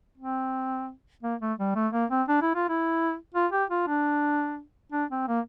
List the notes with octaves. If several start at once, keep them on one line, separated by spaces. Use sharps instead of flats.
C4
A#3
A3
G3
A3
A#3
C4
D4
E4
F4
E4
F4
G4
F4
D4
D4
C4
A#3